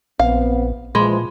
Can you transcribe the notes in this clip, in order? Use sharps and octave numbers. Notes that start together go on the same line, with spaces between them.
A#1 B3 C4 F5
A#2 E3 F3 G#3 G#4 C5 B5 C6